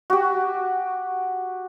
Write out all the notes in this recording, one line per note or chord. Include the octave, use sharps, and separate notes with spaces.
F#4 G4